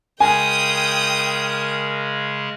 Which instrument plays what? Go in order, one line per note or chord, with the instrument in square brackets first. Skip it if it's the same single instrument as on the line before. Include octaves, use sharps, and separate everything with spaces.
[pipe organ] C#3 G#3 [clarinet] A#4 [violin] G5 D#6 [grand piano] G#5